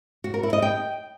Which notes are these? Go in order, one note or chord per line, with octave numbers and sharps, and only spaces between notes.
F#4
A#4
E4
D#5
G5